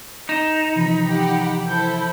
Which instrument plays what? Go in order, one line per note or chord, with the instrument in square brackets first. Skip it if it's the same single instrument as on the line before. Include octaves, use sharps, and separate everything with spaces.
[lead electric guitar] D#4 [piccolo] E7
[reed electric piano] C3 E3 F3 [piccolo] B5
[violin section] G4 F#5
[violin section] E4 A4 C5 [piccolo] G6